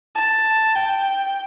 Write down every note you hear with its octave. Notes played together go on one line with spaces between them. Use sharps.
A5
G5